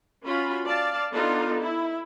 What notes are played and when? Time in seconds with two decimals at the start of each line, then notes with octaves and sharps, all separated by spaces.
0.24 C#4 F4 F#4 B5
0.64 D5 F5 A5
1.11 B3 D4 D#4 F4 A4
1.60 E4